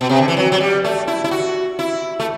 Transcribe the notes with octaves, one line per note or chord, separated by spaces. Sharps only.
B2
C3
D3
E3
F#3
F#3
G3
A3
E4
E4
F#4
E4
A3